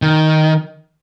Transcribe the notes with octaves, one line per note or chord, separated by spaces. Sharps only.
D#3